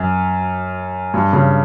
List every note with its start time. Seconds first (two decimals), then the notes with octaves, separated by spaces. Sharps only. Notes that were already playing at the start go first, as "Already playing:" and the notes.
Already playing: F#2
1.14 G2
1.33 C#3